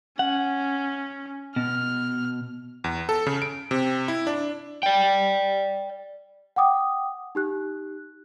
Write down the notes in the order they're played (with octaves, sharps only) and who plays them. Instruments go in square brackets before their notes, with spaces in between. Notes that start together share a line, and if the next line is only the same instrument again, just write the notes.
[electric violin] C#4 [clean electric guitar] F#5
[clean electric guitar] B2 [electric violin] F6
[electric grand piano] E2
A4
C#3
D7
C3
E4
D4
[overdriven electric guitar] D5 G5
[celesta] F#5 G5 D6 D#6
D#4 G4 F#6